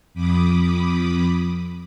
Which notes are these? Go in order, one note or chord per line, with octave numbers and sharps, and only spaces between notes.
F2 B5 D6 D#6